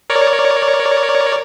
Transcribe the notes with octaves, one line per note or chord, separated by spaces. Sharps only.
A#4 C#5 D5